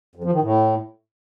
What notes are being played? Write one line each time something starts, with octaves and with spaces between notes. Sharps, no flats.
F2
F3
D#3
A2